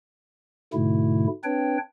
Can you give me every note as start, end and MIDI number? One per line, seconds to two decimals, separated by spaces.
0.73 1.27 44
0.73 1.27 47
0.73 1.27 50
0.73 1.27 57
0.73 1.27 64
1.44 1.78 60
1.44 1.78 62
1.44 1.78 71
1.44 1.78 73
1.44 1.78 79